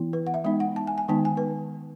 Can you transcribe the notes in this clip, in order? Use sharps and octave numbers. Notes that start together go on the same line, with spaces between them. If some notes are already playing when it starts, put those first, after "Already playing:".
Already playing: E3 B3 E4
B4
F#5
E5
G#3 B3 D#4 E5
F#5
A5
G#5
G#5
D#3 G#3 B3 D#4 A5
G#5
B4